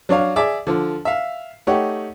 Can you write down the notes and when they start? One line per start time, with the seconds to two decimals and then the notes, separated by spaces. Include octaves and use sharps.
0.09 F#3 D4 C#5 F5
0.36 G#4 D5 E5 D6
0.67 D3 F3
1.05 E5 F5
1.67 A3 D#4 G4 C#5 F#5